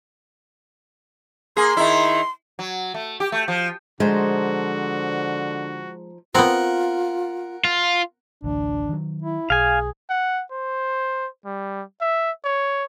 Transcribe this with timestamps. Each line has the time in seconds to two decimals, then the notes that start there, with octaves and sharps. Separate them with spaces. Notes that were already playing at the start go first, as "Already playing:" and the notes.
1.57 A#3 G#4 C6
1.77 D#3 E4
2.59 F#3
2.94 A3
3.20 G4
3.32 A3
3.48 F3
4.00 D3 F3 G#3 D#4 F#4 C5
6.35 B3 C4 F4 A#4 F#5
7.65 F4
8.44 A1 D2 D4
8.89 D#3 F#3
9.22 E4
9.50 B1 G#4 F5 G#5
10.10 F#5
10.51 C5
11.45 G3
12.01 E5
12.45 C#5